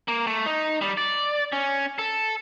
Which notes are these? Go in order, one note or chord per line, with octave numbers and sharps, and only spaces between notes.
A#3
A3
D#4
G3
D5
C#4
A4